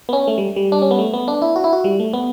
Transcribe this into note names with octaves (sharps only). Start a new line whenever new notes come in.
B3
C#4
A3
G3
G3
D4
C#4
B3
A3
B3
D4
E4
F#4
E4
F#4
G3
A3
B3